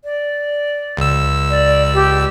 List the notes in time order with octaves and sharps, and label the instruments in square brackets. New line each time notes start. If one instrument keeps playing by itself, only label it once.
[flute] D5
[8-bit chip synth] C#2 E6
[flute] D5
G4